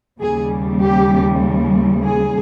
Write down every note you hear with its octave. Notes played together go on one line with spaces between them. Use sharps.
D#2 C#3 G3 G#4
G4
G#4